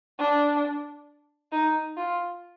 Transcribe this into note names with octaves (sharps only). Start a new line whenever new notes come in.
D4
D#4
F4